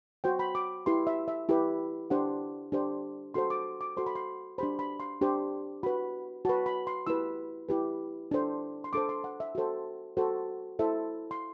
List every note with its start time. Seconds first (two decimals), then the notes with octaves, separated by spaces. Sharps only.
0.24 F#4 C5 G5
0.39 B5
0.55 D6
0.86 E4 G4 B4 C6
1.07 E5
1.28 E5
1.49 E4 G4 B4
2.10 D4 G4 C5 F#5
2.72 D4 G4 C5
3.34 F#4 A4 C5 C6
3.50 D6
3.81 D6
3.97 F#4 A4 C5 C6
4.06 B5
4.15 C6
4.58 D4 G4 C5 B5
4.79 B5
5.00 C6
5.21 D4 G4 C5
5.83 F#4 B4 B5
6.45 F#4 B4 A5
6.66 B5
6.87 C6
7.07 E4 G4 B4 E6
7.69 E4 G4 B4
8.31 D4 A4 C5
8.84 C6
8.93 D4 A4 C5 D6
9.09 C6
9.24 F#5
9.40 E5
9.55 F#4 A4 C5
10.17 F#4 A4 C5
10.79 E4 A4 C5 E5
11.31 C6